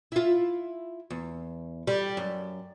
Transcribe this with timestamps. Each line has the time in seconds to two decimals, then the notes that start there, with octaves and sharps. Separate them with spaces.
0.12 E4 F4
1.10 E2
1.87 G3
2.17 F#2